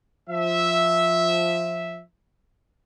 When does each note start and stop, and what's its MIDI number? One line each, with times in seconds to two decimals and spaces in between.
0.29 2.01 53
0.29 2.01 76